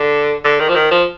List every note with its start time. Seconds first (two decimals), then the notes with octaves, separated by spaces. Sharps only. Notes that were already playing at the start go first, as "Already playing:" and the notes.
Already playing: D3
0.44 D3
0.60 D#3
0.69 F3
0.76 D#3
0.91 F3